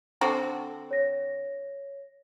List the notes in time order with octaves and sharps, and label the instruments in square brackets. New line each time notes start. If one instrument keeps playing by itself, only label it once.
[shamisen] D3 C4 F#4
[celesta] C#5 A#6